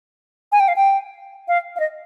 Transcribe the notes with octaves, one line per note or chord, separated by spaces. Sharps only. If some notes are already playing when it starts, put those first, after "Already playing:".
G#5
G5
F5
G5
F5
F5
D#5